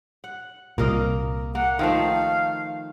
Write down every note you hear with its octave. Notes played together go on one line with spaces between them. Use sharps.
F#5
C2 A#2 A#3 A#4 D#5
A#3 F#5
D#3 F3 A3 F5